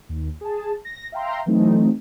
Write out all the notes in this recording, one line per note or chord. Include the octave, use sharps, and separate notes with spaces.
D#2
G#4 A5
A#6
E5 F5 G5 A#5 C6
E3 F#3 A3 C4 D#4